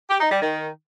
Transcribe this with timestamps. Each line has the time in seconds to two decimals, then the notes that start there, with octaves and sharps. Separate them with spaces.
0.10 G4
0.21 D#4
0.31 G3
0.42 D#3